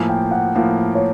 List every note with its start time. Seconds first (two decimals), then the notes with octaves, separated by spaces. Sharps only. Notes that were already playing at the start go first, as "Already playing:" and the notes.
Already playing: A2 F3 A#3 G#5
0.09 G5
0.31 F#5
0.55 A2 F3 A#3 F5
0.95 C#5